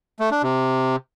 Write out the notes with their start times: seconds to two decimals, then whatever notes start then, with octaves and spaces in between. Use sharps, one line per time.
0.20 A3
0.31 D4
0.43 C3